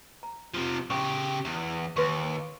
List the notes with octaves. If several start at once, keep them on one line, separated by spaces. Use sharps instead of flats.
A#5
C3 F3
C#3 G4 C#6
E2
D#2 B4 C6 C#6